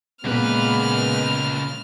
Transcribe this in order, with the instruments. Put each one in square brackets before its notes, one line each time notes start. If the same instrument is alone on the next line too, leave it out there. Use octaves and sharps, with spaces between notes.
[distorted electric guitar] C#2 B4 [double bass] A#2 [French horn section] G#3 B3 [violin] F6